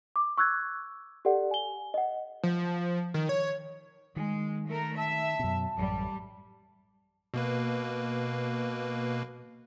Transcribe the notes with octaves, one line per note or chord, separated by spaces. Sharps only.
D6
C#6 E6 F#6 G#6
G4 A4 D5 F#5
G#5 G7
D#5 F#5
F3
D#3
C#5
D#3 G#3
A3 A#4
E5 A5
F#2 B2
A1 F#2 G3
B2 A#3 B4